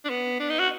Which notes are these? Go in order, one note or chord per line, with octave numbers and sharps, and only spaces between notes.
D4
B3
D4
D#4
F#4